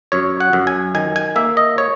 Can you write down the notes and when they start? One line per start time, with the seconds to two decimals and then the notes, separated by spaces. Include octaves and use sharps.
0.12 F#2 C#5
0.40 F#5
0.53 F#2
0.67 G#5
0.95 D#3 G#5
1.16 G#5
1.36 A#3 E5
1.57 D#5
1.78 C#5